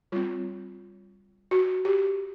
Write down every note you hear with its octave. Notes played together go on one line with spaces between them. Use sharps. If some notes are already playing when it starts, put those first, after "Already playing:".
G3 C4 F4
F#4
G4